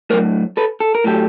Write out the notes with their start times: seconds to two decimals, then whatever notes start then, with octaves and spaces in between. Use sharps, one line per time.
0.10 A2 F#3 A#4 C5
0.57 A4 B4
0.80 A4
0.95 A#4
1.04 A2 F#3 G4 A4